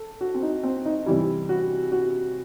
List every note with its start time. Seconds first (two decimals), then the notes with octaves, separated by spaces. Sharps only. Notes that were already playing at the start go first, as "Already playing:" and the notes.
Already playing: A4
0.21 F#4
0.34 C4
0.42 D#4
0.63 C4
0.85 D#4
1.06 C3 E3 G3 E4
1.49 F#4
1.92 F#4